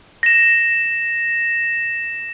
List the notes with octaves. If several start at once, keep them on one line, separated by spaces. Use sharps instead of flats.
A#6 E7